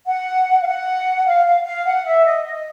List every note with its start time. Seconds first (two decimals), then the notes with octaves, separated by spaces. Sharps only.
0.06 F#5
0.61 F5
0.66 F#5
1.25 F5
1.45 F5
1.65 F5
1.85 F#5
2.05 E5
2.24 D#5
2.44 D#5